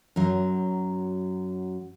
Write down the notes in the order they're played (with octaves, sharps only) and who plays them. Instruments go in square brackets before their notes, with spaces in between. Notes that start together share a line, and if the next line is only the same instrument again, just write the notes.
[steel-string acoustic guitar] F#2 F#3